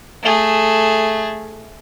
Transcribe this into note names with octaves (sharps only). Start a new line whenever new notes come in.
A3 G#4